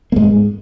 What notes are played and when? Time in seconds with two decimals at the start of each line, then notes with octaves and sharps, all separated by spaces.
0.12 A#3
0.16 G#2 G#3